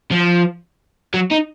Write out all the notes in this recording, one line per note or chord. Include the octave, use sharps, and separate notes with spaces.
F3
F#3
D#4